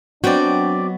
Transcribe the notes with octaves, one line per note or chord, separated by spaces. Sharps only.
F#3 B3 C4 D4 F#4 D5 D#5 G5